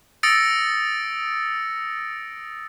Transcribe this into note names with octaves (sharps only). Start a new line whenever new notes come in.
D#6 E6 A6 A#6 C#7 D7